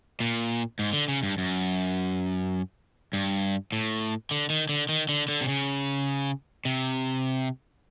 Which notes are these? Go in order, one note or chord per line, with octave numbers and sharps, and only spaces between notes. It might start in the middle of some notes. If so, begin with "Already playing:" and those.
A#2
G#2
D3
C#3
G2
F#2
G2
A2
D3
D#3
D3
D#3
D3
D3
C3
C#3
C3